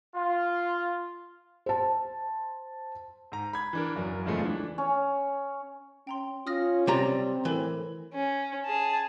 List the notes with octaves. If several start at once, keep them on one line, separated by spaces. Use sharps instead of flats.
F4
C5 A5
G#2 A#5
B5 G#6
E3 D4 A#4
F#1 F#2 A#4
A#1 E2 C#3 F3 G#3 A3
E3 D4
C#4
C#4 G5 A#5 C6
C#4 F4 D#6 F6 A#6
C3 G3 C4 G4 D5 A#5 A#6
A2 E3 A4 A#4
C#4
G#4 A5